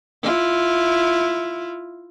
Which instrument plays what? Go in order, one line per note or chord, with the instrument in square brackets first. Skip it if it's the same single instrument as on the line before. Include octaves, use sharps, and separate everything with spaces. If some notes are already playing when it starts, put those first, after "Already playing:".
[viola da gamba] E4 F4